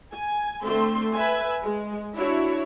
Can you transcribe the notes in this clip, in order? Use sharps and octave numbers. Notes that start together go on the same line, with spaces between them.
G#5
D3 A3 C4 C6
B4 E5 G#5
G#3
D4 E4 F#4 C#5